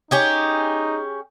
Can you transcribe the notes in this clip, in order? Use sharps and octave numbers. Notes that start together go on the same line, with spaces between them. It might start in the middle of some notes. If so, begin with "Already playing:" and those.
C#4 D#4 G4 G#4